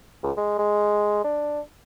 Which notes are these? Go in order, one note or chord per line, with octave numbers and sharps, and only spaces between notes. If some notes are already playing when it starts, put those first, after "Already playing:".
C#2
G#3
G#3
D4